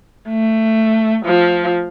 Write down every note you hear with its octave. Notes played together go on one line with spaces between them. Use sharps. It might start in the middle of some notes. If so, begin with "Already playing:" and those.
A3
F3